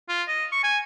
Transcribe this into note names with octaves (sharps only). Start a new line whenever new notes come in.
F4
D#5
C#6
G#5